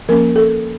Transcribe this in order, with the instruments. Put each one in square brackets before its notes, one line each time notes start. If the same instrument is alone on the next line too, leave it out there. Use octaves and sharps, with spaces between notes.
[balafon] F3 A#3 C#4 A#4
A4